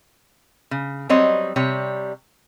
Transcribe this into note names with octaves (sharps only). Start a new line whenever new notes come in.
C#3
F#3 G3 C4 C#5 D#5
C3 G3 C#5